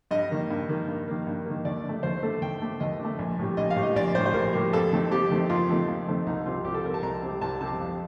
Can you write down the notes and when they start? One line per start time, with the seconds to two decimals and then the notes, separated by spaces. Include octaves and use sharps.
0.11 G2 D#5
0.30 D#3 A#3
0.50 G2
0.69 D#3 A#3
0.88 G2
1.08 D#3 A#3
1.27 G2
1.46 D#3 A#3
1.65 D#2 D5
1.84 D3
1.89 A3
2.03 D#2 C5
2.23 D3 A3 A4
2.41 D#2 G5
2.61 D3 A3
2.80 D#2 D#5
2.99 D3
3.04 A3
3.19 A#1
3.39 A2 G3
3.57 A#1 D#5
3.70 F5
3.76 A2 G3
3.83 D#5
3.96 A#1 D5
4.15 A2 G3 C5
4.26 C5
4.34 A#1 A#4
4.53 A2 G3
4.73 F2 A4
4.92 D#3 A3 C4
5.11 F2 G4
5.31 D#3 A3 C4
5.49 F2 F4
5.69 D#3 A3 C4
5.88 F2
6.07 D#3 A3 C4
6.27 C2 D#4
6.46 C3 G3 C4 F4
6.65 C2 G4
6.74 A4
6.84 C3 G3 C4 A#4
6.94 A5
7.03 C2 A#5
7.22 C3 G3 C4
7.41 C2 A5
7.61 C3 G3 C4 A5
7.81 F2